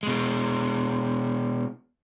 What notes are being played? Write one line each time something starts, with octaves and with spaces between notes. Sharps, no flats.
B2 G#3